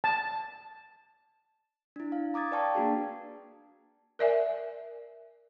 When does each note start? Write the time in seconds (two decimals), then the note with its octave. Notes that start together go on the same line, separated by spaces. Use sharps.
0.04 A5
1.96 D4 E4
2.12 F5
2.34 A#5 D6 D#6 G#6 A6
2.51 B4 D5 F5 G5 A5 C#6
2.75 A#3 D4 F#4 G#4
4.19 A#4 D5 E5 G#5